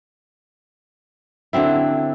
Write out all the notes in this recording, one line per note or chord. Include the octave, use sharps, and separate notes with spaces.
D3 F#3 C4 E4